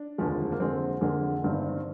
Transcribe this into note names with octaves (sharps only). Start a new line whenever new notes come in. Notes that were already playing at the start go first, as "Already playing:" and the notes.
Already playing: D4
F1 D#2 D3 F3 G#3
A#3
F2 D3 G#3 C4
F2 D3 G#3 A#3
G1 G2 D#3 C4